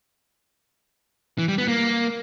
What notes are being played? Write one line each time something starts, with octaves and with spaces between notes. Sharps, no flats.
E3
G3
B3
A#3